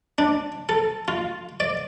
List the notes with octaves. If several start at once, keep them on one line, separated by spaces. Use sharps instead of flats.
D4
A4
F4
D5